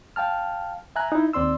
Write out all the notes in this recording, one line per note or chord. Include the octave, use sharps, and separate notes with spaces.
F5 G5 A5 F6
E5 G#5 A#5 F#6
D#4 E4
D#2 C4 D5 C6 E6